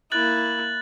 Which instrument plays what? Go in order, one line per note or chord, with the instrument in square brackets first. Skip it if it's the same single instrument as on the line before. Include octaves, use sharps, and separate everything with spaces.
[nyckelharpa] A#3 E4 [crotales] F#6 A6 F#7